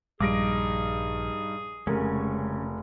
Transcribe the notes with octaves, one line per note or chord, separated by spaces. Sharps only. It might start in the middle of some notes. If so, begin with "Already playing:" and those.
A#1 G2 D#4 G#4 D6 A#6 D7
F1 C#3 G#3 C#4 A#4